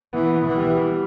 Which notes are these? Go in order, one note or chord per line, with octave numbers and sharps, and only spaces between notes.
E3 B3
B3
E3
G3
G3